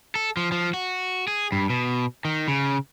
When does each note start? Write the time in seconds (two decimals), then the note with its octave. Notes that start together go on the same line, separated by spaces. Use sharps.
0.15 A4
0.37 F3
0.52 F3
0.74 F#4
1.27 G#4
1.52 G2
1.70 B2
2.25 D#3
2.48 C#3